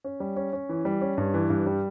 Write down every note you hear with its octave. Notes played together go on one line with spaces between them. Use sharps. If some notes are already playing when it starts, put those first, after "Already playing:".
C#4
G3
C#4
C#4
E3
G3
C#4
G2
E3
G2
G3